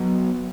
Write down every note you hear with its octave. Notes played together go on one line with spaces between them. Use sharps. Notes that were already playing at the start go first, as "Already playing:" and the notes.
Already playing: F#3 B3